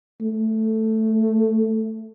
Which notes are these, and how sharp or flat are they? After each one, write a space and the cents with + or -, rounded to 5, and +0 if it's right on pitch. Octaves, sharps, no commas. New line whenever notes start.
A3 +5